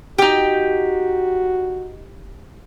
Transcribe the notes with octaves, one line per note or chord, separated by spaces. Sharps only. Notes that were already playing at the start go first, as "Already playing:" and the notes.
D#4 F#4 G4 G5